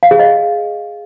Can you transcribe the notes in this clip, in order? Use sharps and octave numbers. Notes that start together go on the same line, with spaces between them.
F5
G#4
D#5